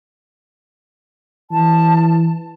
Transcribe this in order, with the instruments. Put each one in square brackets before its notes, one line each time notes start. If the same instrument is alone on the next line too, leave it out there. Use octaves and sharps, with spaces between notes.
[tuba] E3 [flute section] A5